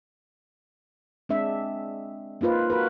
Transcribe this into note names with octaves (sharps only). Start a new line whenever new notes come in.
G#3 C4 D4 E5
A#3 D#4 F4 B4 C5
F#4 A#4 B4